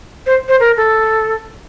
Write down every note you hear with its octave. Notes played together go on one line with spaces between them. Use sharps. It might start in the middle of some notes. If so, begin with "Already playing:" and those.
C5
C5
A#4
A4